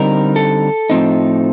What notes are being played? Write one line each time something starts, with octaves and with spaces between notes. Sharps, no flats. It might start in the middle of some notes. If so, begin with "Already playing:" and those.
Already playing: D3 G3 C4 D#4 A#4
A4
A2 F3 C4 D#4